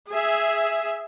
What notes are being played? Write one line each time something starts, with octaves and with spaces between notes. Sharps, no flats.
G#4 E5